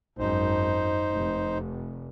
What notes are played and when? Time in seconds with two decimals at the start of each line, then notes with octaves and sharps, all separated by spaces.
0.19 G#1 F#2 D#4 C5
1.12 F1